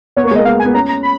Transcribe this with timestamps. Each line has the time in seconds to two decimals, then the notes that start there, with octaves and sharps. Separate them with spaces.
0.17 B3 C#5
0.24 A#3
0.27 C#5
0.31 G#3
0.36 A#3 D#5
0.45 B3 F5
0.60 G#5
0.65 B3
0.74 C#4 A#5
0.89 A#5
1.03 B5